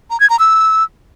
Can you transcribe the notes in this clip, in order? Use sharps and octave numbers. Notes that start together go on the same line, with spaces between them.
A#5
G#6
A#5
E6